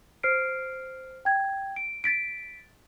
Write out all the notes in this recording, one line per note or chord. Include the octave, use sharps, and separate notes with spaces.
C5 F6 C7 D7
G5 G#6
D7
A6 B6 D7